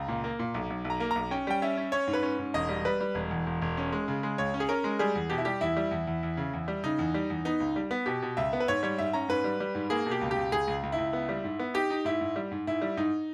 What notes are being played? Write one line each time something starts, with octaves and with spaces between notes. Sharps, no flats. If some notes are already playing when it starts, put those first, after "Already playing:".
Already playing: C#2 A#5
A#2
A#3
A#2
B1
B1
B1
A#5
A#3
B1 A#5
C#4 G5
G3 G5
C#4 E5
C#4
C#4 C#5
G#2
B4
C#4
G#2
E1 D#5
G3
G3 B4
G3
E1
E2
E1
E1
C#4
G#3
C#3
G#3
C#2 C#5
C#4
G#4
C#4 A#4
G#3
G3 G#4
E2
B2 G4
E4
G3 G4
E2 E4
G3
E2
E2
E2
C#3
E2
G3
C#3 D#4
E2
G3
E2
B3 D#4
C#2
G3
B3
B2 G4
B2
C#2 E5
B3
B4
G#2 C#5
G3 C#5
G#2 E5
C#4 A#5
G#2 B4
G3
G3
G#2
A#3 G#4
B2
G4
C#2
G4
C#2
C#2 G#4
C#2
C#2
E4
C#2
B3
G3
G#2
B3
D#4 G4
D#4
G#2 E4
G#2
G3
G#2
G#2 E4
G3
G#2 D#4